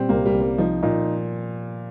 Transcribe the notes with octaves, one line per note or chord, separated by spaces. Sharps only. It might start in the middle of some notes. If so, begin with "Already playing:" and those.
Already playing: A#2 G3 C4
C2 A#3
G3
C2
G3
F3 D#4
A#2 D#4